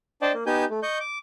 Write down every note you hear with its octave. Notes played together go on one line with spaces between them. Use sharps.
D4 C5 D5 D#5 G5 A5
A#3
B3 D#4 G4 G#5 G6
A3
D#5 C#6 G6
D6